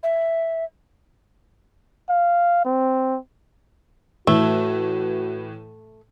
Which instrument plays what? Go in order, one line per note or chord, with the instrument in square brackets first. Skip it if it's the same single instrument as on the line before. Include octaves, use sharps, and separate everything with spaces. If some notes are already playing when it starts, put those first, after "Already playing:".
[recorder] E5
[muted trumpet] F5
C4
[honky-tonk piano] A2 E3 [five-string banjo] A3 [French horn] F#4